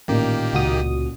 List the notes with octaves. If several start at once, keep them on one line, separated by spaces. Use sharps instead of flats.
A1 A#2 D#3 A#3 G4
C#2 F#4 D#6